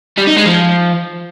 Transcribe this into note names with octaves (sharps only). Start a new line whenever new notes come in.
G3
D#4
G#3
F3